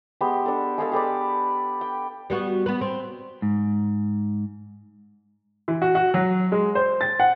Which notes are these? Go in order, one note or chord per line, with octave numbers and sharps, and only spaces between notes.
G#3 B3 G4 C6
D4 A4
G#3 G#4 A4 F5
G4 A4 B4 D5
G5
G3 B3 F#4
B3 B4
C4
G#2
E3
F#4
F#4
F#3
G#3
C5
A6
F#5